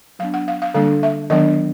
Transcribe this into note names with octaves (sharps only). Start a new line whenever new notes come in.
F#3 B3 D4 F5
F#5
F5
F5
D3 G3 A#3 D4 F5
E5
D#3 F#3 B3 D4 D#5